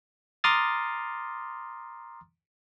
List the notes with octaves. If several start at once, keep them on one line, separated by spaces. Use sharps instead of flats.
A#5 C6 D6 D#6 F6 A6